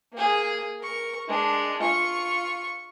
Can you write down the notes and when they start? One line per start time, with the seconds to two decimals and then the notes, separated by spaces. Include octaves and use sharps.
0.13 A#3 G#4
0.80 A#4 C#6
1.28 G#3 D4
1.80 F4 C#6